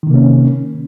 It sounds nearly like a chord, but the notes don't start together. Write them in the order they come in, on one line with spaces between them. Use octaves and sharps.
D#3 C3 A#3 C#4